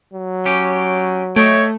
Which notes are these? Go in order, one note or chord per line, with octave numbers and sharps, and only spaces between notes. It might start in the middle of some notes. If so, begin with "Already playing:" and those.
F#3
C#4 G4
A3 C#5 D#5 G5